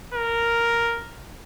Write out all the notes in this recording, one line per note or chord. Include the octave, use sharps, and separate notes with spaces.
A#4